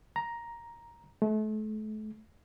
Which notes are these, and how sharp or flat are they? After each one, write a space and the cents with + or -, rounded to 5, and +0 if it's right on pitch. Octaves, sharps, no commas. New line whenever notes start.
A#5 +10
A3 -35